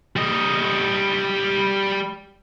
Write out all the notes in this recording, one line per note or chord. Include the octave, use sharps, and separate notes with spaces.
G3 D#5